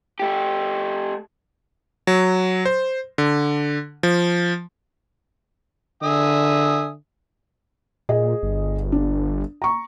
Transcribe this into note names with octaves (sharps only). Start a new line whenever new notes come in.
A3 G4
F#3
C5
D3
F3
D3 E5 G#5 D#6
A#2 G#4 D#5
G1
D4
A#5 C#6